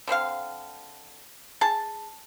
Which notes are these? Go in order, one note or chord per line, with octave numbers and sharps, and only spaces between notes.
D3 C4 C5 F5
G#4 A5